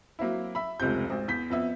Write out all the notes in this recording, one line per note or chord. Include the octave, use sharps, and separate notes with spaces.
F#3 A#3 C4 E4
E5 B5
F1 C#2 C3 C4 G6
G#1 C4
E2 G6 B6
F2 B3 E5